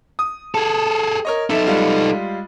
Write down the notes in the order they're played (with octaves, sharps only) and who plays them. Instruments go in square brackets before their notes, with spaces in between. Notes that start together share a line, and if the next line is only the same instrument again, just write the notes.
[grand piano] D#6
[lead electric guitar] G#4 A4
[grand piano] A#4 C#5 D#5
[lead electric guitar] D#4 A4 [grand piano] E5
[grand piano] G3 G#3 F4